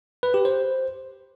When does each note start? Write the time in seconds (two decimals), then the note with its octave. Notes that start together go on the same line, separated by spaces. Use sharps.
0.23 B4
0.34 G4
0.45 C5